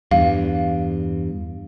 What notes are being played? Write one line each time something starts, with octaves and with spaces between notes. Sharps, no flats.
E2 G2 F5